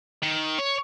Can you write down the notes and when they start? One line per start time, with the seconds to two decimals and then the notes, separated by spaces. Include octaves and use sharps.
0.23 D#3
0.59 C#5